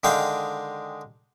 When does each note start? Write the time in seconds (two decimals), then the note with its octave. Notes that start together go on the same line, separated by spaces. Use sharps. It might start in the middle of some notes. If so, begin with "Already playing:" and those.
0.04 D3 D#3 G#3 F5 G5